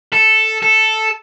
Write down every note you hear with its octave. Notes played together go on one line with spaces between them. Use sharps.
A4
A4